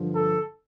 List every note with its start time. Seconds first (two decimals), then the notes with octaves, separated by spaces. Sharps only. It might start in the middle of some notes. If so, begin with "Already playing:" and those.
Already playing: G2 D3 F3
0.15 A4